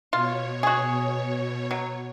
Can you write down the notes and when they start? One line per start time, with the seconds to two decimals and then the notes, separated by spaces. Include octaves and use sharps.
0.13 B2 F4 C#5
0.63 F#4 G#4
1.71 F#3